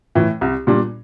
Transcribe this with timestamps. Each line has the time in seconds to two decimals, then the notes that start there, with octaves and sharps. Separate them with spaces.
0.15 A2 E3
0.41 C2
0.67 A#2 G3 D4